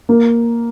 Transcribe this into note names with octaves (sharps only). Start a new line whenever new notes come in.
A#3